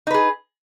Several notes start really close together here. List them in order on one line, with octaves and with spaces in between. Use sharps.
D#4 B4 G#4